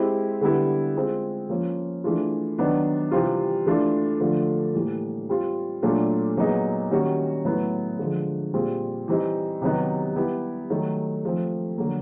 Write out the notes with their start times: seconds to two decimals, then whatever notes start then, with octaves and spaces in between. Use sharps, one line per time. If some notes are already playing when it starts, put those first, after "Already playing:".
Already playing: G#3 C4 E4 G4
0.41 D3 G3 B3 E4
0.96 G#3 C4 F4 G#4
1.49 F3 A#3 C#4 F4
2.04 E3 A3 D4 F4 G#4
2.58 D#3 F#3 B3 D4
3.12 C3 E3 G3 C4 F4
3.67 E3 A3 D4 F4
4.20 D3 F3 A3 D4 F4
4.74 A2 E3 G3 A#3
5.29 G3 C4 F4
5.83 A#2 F#3 A3 D4 F4
6.37 A#2 F#3 B3 D#4 G#4
6.91 D#3 G3 A#3 C#4 F#4
7.45 A2 F#3 B3 E4
7.99 D3 F3 G#3
8.54 A#2 G3 C4 F4 G#4
9.08 E3 G3 C4 D#4
9.62 C3 D#3 F#3 B3 D#4
10.16 G3 B3 E4 G4
10.70 D#3 F#3 A3
11.25 F3 A3 C4
11.78 D3 F#3 A#3